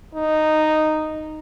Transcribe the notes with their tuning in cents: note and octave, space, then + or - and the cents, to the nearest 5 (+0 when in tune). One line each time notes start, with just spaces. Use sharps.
D#4 -5